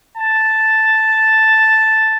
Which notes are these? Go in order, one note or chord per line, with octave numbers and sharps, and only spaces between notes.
A5